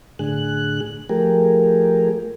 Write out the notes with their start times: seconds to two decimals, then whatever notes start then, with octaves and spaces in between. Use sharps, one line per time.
0.19 A2 D3 G#4 F#6
1.09 F3 A3 G4 G#4 A#4